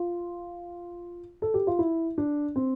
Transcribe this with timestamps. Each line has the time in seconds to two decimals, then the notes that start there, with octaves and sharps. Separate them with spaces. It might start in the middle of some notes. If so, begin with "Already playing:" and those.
Already playing: F4
1.42 A4
1.54 G4
1.67 F4
1.79 E4
2.18 D4
2.56 C4